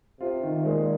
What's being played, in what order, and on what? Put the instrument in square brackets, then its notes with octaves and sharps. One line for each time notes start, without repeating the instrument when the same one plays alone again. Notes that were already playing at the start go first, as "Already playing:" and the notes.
[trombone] C3 [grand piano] F4
[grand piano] D#3
[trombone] A#2 [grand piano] G#3